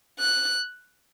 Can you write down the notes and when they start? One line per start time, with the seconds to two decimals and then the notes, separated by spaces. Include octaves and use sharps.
0.20 F#6